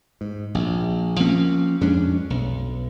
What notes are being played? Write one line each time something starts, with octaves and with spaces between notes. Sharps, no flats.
G#2
A#1
F3 A#3 C4 C#4
F2 G#3 C#4 D4
B1